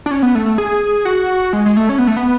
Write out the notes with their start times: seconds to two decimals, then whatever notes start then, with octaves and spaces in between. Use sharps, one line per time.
0.06 D4
0.11 C#4
0.23 B3
0.35 A3
0.46 A3
0.58 G#4
1.05 F#4
1.53 G#3
1.66 G#3
1.77 A3
1.89 C#4
1.98 B3
2.07 A3
2.17 B3